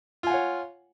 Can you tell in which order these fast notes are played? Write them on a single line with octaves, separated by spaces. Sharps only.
F4 G#5 F#5 C#5